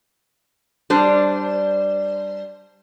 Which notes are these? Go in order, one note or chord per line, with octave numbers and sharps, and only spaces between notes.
G3 D4 C5